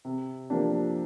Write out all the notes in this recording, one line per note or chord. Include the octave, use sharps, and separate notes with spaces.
C3
F3 A#3 D4 G4